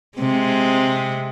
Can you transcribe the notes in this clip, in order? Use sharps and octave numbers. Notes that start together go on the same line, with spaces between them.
C3 G#3